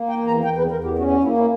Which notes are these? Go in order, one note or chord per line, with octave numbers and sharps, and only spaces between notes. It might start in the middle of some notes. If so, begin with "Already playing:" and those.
Already playing: A#3
G5
E2
A#5
E2 G5
B4
E2 A#4
G4
C#4 F#4
F#4
A#3 E4
E4